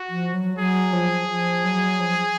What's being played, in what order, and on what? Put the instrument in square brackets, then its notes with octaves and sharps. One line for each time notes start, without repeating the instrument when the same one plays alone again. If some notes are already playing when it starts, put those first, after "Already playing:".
Already playing: [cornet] F#4
[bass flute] F3
F#3
[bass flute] F#3 [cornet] G#4
[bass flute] F3
F3
F#3
F3